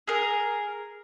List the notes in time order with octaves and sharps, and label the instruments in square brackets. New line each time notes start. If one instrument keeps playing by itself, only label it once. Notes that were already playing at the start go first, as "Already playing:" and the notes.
[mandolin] G#4 A#4